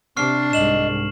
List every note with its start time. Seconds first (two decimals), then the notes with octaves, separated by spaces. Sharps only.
0.17 C3 D4 C#6 F6 C7
0.53 C2 G#2 D#5 E7 F#7